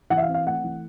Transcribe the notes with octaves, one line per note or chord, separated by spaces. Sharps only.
E3 F#5
E5
F5
C4
F5
A3 F#5
E3